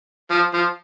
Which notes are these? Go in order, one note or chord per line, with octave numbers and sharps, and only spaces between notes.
F3
F3